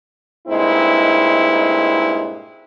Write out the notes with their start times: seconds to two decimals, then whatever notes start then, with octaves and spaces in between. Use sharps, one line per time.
0.48 G2 A#2 G#3 C4 D#4 E4